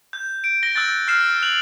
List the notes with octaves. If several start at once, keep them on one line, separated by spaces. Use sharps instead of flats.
G6
D7
A#6 G7
E6 F#6 G6 A6
F6 C7 E7
F#6 F7 F#7